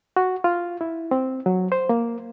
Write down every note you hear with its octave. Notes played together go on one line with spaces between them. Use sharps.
F#4
F4
E4
C4
F#3
C5
A#3